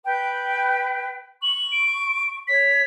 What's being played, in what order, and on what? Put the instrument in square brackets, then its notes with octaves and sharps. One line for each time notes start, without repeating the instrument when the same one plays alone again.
[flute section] B4 G5
[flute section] C#6 [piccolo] F#7
[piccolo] D7
[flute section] C#5 [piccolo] B6